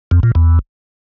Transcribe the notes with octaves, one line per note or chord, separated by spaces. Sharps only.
F2
A#2
E2